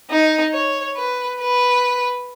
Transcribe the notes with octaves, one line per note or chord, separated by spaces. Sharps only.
D#4
C#5
B4
B4